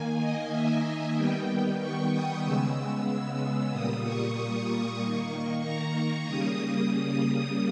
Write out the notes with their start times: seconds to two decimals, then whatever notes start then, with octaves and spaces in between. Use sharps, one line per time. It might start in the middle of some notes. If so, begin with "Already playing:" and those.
Already playing: D#3 A#3 G#5
0.21 D#5
0.52 E5
1.16 D#3 G3 B3 G5
1.80 C#6
2.12 D#6
2.43 C#3 G#3 B3 E6
3.08 E6
3.71 A#2 G3 A#3 D#6
4.04 C#6
4.99 D#3 A#3
5.63 A#5
6.26 C#3 G3 A#3 D#6
6.90 D#6